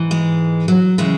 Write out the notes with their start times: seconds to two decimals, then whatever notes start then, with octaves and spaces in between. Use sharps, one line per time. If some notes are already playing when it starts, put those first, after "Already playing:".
Already playing: G#2 E3
0.11 G#3
0.68 F#3
0.98 C#3 E3 G#3